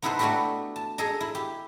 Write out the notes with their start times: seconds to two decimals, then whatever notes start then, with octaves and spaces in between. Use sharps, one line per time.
0.02 B3 D#4 E4 A4 B4 C5
0.19 A3 B3 D4 E4 F#4 G4
0.76 A5
0.98 G#4 A4 D#5 A#5
1.21 E4
1.35 G4